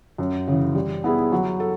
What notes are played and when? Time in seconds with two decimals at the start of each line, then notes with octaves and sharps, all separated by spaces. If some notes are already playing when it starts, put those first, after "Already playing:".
0.18 F#2
0.48 C#3 E3
0.75 G3
1.04 B3 E4 G#4
1.32 F#3
1.60 A4